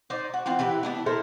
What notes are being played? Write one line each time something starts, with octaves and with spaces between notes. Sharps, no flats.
D#4 C5 D5
F#4
E3 C4 F4 F#4
E3 E4 G4 B4
B3 D4 E4
E4 A4 A#4 C5